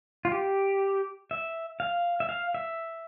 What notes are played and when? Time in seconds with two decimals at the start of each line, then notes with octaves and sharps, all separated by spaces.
0.25 F4
0.32 G4
1.31 E5
1.80 F5
2.20 E5
2.29 F5
2.54 E5